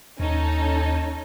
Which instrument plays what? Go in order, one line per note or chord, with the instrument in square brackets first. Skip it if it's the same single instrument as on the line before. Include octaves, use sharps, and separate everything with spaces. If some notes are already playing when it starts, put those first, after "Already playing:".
[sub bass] D#2 [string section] C#4 D#4 A4